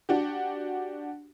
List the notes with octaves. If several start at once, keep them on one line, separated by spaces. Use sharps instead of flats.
D4 F#4 G4